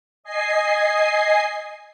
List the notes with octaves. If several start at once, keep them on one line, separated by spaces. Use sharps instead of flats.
D#5 G#5 C7